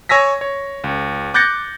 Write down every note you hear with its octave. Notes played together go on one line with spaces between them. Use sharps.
C#5 G#5 E6 A#6 B6
C#5
C#2
D6 F#6 G6 A6 A#6 C#7